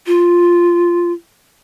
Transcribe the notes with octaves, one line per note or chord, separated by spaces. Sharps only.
F4